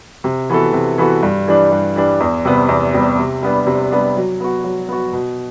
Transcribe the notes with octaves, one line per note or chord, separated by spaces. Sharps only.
C3
E3 B3 F#4 A4
C3
E3 B3 F#4 A4
G2
E3 G3 D4
G2
E3 G3 D4
E2
C3 G3 B3
E2
C3 G3 B3
C3
G3 B3 D4
C3
G3 B3 D4
F#3
B3 F#4
F#3
B3 F#4
B2